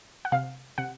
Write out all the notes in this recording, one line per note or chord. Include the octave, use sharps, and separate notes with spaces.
F#5
C3 F5
C3 F#5